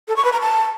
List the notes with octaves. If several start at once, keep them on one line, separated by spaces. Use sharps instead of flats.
A4
C#6
B4
A#5
A5